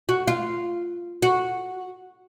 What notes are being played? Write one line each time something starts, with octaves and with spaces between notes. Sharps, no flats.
F#4
F4
F#4